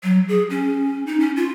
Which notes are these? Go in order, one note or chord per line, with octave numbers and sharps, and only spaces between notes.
F#3
G#4
C#4
D#4
C#4
F4